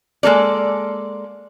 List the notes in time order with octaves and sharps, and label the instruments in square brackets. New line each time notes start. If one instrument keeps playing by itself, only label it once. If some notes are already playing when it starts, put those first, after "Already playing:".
[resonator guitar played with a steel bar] G#3 A#3 A4 D5